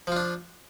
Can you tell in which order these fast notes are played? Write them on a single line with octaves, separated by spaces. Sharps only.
F3 F4 D4